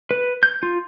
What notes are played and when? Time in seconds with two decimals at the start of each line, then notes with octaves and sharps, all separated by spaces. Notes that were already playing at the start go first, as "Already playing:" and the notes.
0.11 B4
0.43 G6
0.63 F4